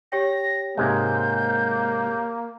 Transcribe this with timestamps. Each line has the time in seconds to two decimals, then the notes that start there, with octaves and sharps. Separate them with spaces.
0.12 G4 C#5 G5 A#6
0.78 G#2 C3 G#3 A#3 G6